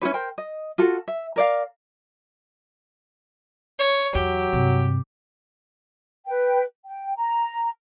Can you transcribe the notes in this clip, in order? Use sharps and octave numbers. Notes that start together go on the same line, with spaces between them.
C#4 E4 F#4 B4
A#4 C5 G5
D#5
F4 F#4 A4
E5
A#4 D5 F5
C#5
E2 F#3 G4
G2 C3
B4 G5
G5
A#5